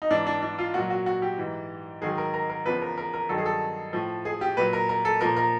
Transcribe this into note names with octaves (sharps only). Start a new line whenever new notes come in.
D#4
G#2 E3 D4
D4
D4
F4
A#2 F#3 F#4
F#4
F#4
G4
G#2 E3
G#2 D#3 F#3 G#4
A#4
A#4
A#4
E2 C#3 F3 B4
A#4
A#4
A#4
G2 D#3 F#3 A4
G#4
A4
A2 F3
G#4
G4
A#2 F#3 B4
A#4
A#4
A4
A#2 F3 A#4
A#4